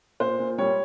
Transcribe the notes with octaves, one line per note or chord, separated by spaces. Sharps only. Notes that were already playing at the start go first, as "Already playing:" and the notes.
A#2 C5
A#2
G3 C#5